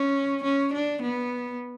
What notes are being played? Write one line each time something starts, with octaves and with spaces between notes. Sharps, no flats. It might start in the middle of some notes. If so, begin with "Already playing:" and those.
Already playing: C#4
C#4
D4
B3